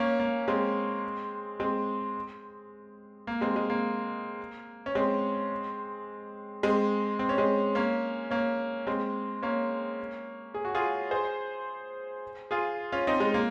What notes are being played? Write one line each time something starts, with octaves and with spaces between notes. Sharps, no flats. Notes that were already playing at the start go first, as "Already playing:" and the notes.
Already playing: A#3 C#4
A#3
G#3 C4
G#3 C4
A#3
G#3 C4
G#3
A#3
C#4
G#3 C4
G#3 C4
C4
C#4
G#3 C4
A#3 C#4
A#3 C#4
G#3 C4
A#3 C#4
G#4
F#4
F4 G#4
G#4 C5
F4 G#4
C#4 F4
C4 D#4
G#3
A#3